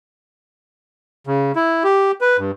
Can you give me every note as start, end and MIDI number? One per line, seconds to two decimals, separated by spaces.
1.27 1.52 49
1.56 1.83 64
1.84 2.12 67
2.21 2.37 71
2.38 2.51 43